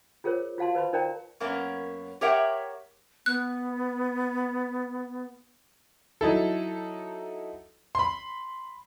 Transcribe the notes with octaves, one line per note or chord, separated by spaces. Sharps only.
F4 G#4 A#4 C5 C#5
F4 F#4 F5 A5 C6
B4 C5 B5 C6
D#4 A#4 C5 D5 G5 A#5
F#2 A#3 B3 C#4
G4 A#4 C#5 E5 F#5 G5
B3 F#6
F#3 D#4 E4 A4
B5 C6